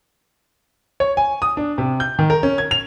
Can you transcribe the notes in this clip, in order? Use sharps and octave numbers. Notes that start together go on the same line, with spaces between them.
C#5
G#5
D#6
D4
C3
G6
D#3
A#4
C#4
G#6
F7